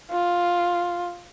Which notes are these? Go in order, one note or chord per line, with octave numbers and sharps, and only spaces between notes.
F4